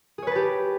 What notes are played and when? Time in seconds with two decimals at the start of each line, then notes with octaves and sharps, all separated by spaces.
0.18 G#4
0.23 C#5
0.27 B4
0.31 A5
0.36 G4